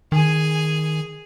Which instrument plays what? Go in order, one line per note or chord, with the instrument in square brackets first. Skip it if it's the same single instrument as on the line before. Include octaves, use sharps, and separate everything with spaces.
[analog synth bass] D#3 [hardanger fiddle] G#4 G#5